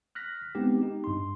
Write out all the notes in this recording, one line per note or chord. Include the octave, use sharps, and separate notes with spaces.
F6 F#6 A#6 B6
G#3 B3 C4 D#4 G4
D#4 G4
G2 C6